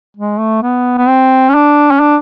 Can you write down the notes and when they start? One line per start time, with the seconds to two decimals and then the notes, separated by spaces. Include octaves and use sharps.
0.17 G#3
0.39 A3
0.62 B3
0.98 B3
1.08 C4
1.49 C#4
1.54 D4
1.91 C#4
2.00 D4